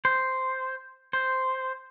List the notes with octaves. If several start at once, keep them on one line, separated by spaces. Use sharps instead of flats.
C5
C5